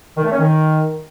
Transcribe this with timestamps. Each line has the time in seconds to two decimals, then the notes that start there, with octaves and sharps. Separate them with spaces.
0.17 D#3
0.24 A3
0.32 C#4
0.39 D#3